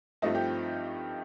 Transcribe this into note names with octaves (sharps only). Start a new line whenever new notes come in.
G2 F3 A3 C4 D#4 F4 D#5
G4